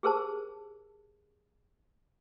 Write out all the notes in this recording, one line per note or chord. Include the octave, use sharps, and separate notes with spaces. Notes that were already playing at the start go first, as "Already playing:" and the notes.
G4 G#4 A#4 C5 A5